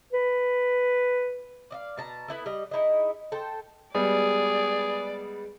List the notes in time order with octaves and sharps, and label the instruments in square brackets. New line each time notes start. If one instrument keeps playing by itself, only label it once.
[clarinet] B4
[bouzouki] D5 D#5 F5
B2 A5 A#5
B3 E4 A4
G3 D#5
D#4 E4 G#4 D#5
A4 C5 G5
[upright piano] G3 G#3 B3 [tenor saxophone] G#4 [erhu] D5